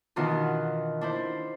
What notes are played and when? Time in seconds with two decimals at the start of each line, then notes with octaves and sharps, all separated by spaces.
0.16 B2 D#3 E3 D4 F4
1.01 D4 E4 C5